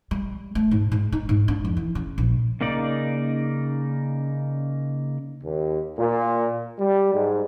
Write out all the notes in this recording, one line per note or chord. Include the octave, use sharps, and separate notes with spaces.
G3
A3
G#2
G#2
D#4
G#2
D4
F2
E3
C#3
A#1
C#3 A#3 D#4 D5
D#2
A#2
G3
G#2